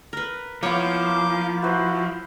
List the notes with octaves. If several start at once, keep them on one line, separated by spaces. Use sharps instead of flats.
A#4 B4
F3 A#3 B3 E4 C#5 F5 D6 G6
E4 F#4 B4 C5